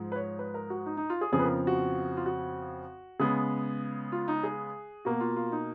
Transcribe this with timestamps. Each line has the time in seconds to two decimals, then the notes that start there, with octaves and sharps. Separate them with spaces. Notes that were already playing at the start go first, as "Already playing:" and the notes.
Already playing: G#2 F3 G#3
0.12 B4
0.16 C#5
0.39 B4
0.54 A#4
0.70 F#4
0.86 D#4
0.97 D#4
1.10 F4
1.21 G#4
1.32 F2 C#3 F3 B3 G#4
1.39 B4
1.44 A#4
1.67 F#4
2.17 F4
2.26 F#4
3.20 C#3 G#3 B3 G#4
4.12 F4
4.28 D#4
4.44 G#4
5.05 B2 A#3 F#4
5.21 F4
5.36 F4
5.52 D#4